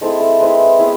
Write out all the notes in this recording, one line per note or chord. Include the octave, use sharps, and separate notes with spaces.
G#3 C4 E4 A4
A4
G#3 C4 E4 B4
B3 E4 G#4